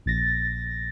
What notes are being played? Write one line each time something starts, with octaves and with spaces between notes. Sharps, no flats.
A#1 A6 A#6